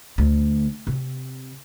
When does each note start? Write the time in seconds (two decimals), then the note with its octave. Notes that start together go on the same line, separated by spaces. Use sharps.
0.18 D2
0.87 C3